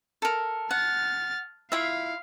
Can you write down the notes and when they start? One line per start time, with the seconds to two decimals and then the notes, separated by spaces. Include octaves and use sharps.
0.22 A4 A#4
0.71 F#5 F6 A6
1.72 E4 F4 E5 F5